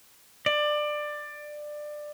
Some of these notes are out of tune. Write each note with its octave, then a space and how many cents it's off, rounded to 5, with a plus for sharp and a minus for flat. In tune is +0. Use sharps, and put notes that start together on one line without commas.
D5 +20